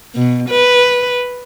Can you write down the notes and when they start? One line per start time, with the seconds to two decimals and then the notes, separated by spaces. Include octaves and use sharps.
0.15 B2
0.50 B4